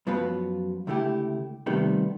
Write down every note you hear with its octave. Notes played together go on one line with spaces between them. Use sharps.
F#2 F3 F#3 B3 F4 B4
C#2 D3 A3 E4 G4
C3 D#3 F3 G3 A3 B3